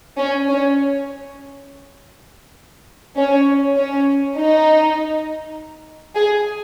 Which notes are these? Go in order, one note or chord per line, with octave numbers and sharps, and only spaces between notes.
C#4
C#4
C#4
C#4
D#4
G#4